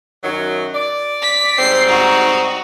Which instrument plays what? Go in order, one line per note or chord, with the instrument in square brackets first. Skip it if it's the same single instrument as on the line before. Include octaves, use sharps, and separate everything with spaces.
[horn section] F#2 D#3 F#3
D5
[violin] B6
[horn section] G#2 G3 C4 [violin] C7
[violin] D#4 F#4